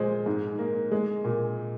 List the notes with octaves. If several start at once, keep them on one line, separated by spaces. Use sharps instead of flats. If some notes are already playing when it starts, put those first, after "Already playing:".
Already playing: A#2 G#3 C5
G#2
A#3
G#3
A#2